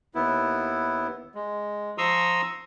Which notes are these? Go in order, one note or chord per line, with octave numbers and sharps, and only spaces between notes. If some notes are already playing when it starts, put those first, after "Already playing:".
D#2 B3 E4
G#3
F3 A#5 C6 C#6 D#6 E6